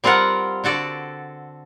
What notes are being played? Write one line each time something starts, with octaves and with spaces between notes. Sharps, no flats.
G3 C4 F4 A#4 F#5
D3 F#4 A4 D5